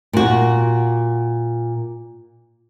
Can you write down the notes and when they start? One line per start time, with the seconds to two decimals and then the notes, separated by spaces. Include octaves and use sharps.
0.13 A#2 F#4